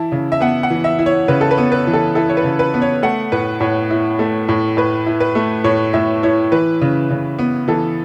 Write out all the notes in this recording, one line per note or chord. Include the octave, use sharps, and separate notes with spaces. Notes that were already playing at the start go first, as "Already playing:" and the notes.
Already playing: E3 E4 A5
C#3
E5
B3 F#5
F#5
E3
E5
E4
C#5
C#3 B4
A4
B4
B3
B4
E3
A4
E4 A4
C#5
B4
C#3
B4
B3
C#5
A3 F#5
A2 B4
A2 C#5
E4
A3
A2
A2 B4
E4
B4
A3
A2 C#5
A2 E5
E4 C#5
E3 B4
C#3
C#3
B3
E3 A4